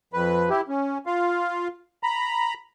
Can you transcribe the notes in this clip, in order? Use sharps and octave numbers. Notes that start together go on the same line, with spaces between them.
F2 B4
E4 G4
C#4
F4 F5
A#5 B5